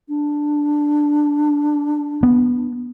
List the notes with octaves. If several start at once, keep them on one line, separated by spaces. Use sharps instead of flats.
D4
B3